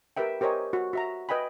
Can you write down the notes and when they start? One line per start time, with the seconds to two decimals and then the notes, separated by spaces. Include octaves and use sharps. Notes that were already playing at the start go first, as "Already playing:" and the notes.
0.17 G4 A#4 B4 E5 G5
0.41 G4 A#4 C5 C#5 D#5 G#5
0.73 F#4
0.93 F#4 E5 A#5
1.29 B4 D#5 G5 G#5 B5